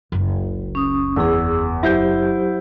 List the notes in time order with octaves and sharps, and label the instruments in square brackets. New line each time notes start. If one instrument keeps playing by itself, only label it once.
[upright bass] F#1 C#2
[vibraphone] C#4 D#6
[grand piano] E2 [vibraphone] G#4 E6
[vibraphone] F#3 G4 C5 [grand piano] E4 G6